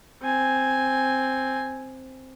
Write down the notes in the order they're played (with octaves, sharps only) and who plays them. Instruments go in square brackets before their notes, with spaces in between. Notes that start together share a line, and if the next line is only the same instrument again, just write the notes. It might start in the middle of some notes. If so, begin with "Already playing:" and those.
[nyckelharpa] C4 G#5